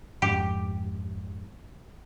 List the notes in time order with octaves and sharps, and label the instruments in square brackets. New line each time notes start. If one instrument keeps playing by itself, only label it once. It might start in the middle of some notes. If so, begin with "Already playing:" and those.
[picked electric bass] F2 G#2 [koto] G4